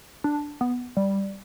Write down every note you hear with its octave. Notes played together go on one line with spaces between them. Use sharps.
D4
B3
G3